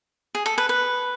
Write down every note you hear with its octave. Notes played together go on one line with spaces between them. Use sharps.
G#4
A4
B4
B4